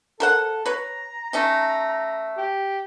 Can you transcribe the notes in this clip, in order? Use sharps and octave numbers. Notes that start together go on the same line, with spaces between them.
A4 A#4 C5 F#5
B4 C#5 A#5
A3 C#4 D#4
G4